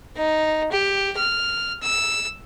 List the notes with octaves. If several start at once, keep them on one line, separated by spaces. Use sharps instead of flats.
D#4
G4
F6
E6